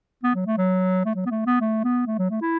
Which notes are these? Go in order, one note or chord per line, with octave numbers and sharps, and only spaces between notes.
B3
F#3
A3
F#3
A3
F#3
B3
A3
B3
A3
B3
A3
F#3
A3
E4